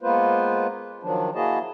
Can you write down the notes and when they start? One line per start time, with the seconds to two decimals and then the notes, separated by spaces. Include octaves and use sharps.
0.02 G#3 A#3 B3 F4 B4 C5
1.03 D#3 F3 F#3 D4
1.35 A#3 E4 F#4 G#4 D#5 A5